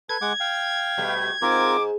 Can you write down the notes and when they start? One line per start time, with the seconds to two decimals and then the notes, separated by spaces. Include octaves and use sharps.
0.09 A4 B4 G#6
0.21 G#3 F#5 D6
0.40 F5 G5
0.98 B2 G3 A3
1.42 G#2 C4 F4 A#4 D6